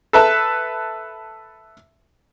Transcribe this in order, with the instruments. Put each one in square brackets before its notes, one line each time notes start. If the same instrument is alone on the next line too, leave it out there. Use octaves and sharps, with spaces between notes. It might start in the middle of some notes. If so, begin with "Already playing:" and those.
[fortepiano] A4 B4 E5 A5